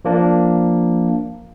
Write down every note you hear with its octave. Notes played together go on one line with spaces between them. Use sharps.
F3 A#3 D4